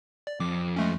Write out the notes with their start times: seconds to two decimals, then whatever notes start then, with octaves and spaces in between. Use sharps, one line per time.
0.27 D5
0.40 F2 D6
0.76 G#3 A3 C#4